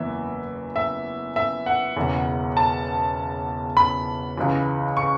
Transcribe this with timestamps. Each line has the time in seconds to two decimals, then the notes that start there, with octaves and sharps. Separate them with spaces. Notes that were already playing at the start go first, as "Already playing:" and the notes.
Already playing: F#1 E2 E3 E5
0.76 E5
1.36 E5
1.66 F#5
1.96 E1 E2 C#3 E3
2.57 A5
3.77 B5
4.37 C#2 C#3 E3
4.97 C#6